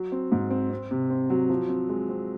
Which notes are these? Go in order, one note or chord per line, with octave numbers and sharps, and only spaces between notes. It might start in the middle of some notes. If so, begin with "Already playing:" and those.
Already playing: F#3
C4
G#2
C4
C4
C3
C4
F#3
F3
C4
G#3
C4